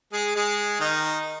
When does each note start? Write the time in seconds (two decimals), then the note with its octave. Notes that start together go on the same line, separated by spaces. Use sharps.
0.13 G#3 G#4
0.35 G#3 G#4
0.80 D#3 D#4